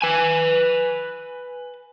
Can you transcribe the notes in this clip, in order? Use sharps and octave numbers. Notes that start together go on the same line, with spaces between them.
B4 G#5